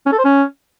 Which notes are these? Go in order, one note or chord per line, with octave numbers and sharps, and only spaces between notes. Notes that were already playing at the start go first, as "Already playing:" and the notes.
C#4
A4
C5
C#4